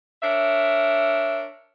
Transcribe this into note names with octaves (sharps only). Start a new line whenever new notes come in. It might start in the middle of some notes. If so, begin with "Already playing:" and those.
D4 A#4 C#5 E5